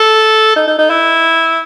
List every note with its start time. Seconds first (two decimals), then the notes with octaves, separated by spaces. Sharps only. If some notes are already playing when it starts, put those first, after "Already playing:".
Already playing: A4
0.56 D#4
0.68 D#4
0.79 D#4
0.90 E4